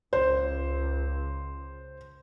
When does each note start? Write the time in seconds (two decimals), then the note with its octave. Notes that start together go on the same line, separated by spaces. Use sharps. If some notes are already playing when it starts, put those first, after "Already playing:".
0.13 C#2 C5